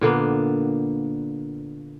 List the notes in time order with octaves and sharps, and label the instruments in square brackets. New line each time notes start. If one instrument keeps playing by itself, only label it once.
[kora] A#2 D3 A#3 B3